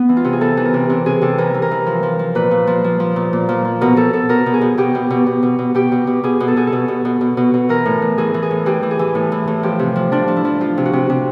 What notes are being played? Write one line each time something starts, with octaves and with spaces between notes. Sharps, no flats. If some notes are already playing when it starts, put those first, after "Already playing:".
Already playing: B3
E3
F4
C3
G#4
E3 A4
E3
A#4
C3
C3
C3 G#4
C3 A4
E3 A#4
E3
A#4
E3
F3
F3
F3
A#2 B4
A#2
F3
F3
F3
A#2
A#2
F3
F3
B2 A#4
B2 A4
B2 A4
B2 A#4
B2
G#4
B2
B2 G4
B2
B2
B2
B2
B2
B2 G4
B2
B2
B2 G#4
B2
A4
B2 G#4
A4
B2
B2
B2
B2
B2
B2
E3 A#4
A2
E3
E3 G#4
E3
G#4
A2
E3 G4
E3
G#4
E3
A2
E3
A2
F3 G4
C3
F3
F3 D4
F3
E4
F3
F3 F4
C3
F#4
C3
C3